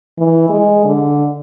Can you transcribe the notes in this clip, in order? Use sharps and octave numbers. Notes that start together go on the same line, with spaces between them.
E3
G#3
D3